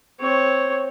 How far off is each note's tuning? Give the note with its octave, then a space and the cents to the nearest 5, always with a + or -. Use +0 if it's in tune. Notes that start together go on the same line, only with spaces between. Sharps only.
C4 +0 C#5 +0